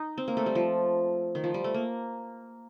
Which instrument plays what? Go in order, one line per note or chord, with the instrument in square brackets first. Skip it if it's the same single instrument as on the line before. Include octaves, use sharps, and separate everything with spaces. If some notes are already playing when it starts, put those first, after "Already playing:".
Already playing: [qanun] D#4
C4
A#3
A3
G3
F3
D#3
F3
G3
A3
A#3